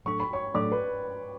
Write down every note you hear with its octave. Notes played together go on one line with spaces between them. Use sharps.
A2 F#3 A3 D4 A4 C#6
B5
C#5 C#6
A2 F#3 A3 D4 A4 D5 D6
B4 B5